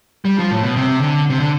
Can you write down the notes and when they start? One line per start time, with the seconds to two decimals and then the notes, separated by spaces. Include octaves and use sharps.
0.25 G3
0.38 F3
0.51 A2
0.63 B2
0.76 C3
1.01 D3
1.30 C3
1.40 D3